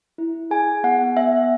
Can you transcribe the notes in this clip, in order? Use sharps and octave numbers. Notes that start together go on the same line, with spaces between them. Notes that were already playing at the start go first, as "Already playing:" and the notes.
E4
G#4 G#5
B3 F#5
B3 E5